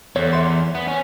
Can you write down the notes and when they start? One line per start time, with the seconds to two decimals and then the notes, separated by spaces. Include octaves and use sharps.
0.16 E2 A4 C#5
0.33 E5 C6
0.75 B3
0.88 C#4